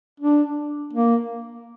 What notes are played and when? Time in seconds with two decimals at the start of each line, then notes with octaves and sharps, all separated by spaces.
0.20 D4
0.94 A#3